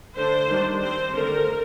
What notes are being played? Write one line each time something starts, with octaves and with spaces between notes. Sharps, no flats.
D3 A3 D4 C5
D#3 G3 D4
G3 C4 C5
D3 A3 C4 A#4